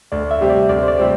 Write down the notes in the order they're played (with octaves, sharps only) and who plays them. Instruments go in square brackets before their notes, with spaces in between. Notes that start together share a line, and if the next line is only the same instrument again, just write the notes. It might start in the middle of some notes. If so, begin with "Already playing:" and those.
[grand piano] D2 [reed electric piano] D5
[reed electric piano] E5
[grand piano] C3 G3 C4 G4
[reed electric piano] D5
[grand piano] D2 [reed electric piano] D5
[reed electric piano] C5
D5
[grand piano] C3 G3 C4 G4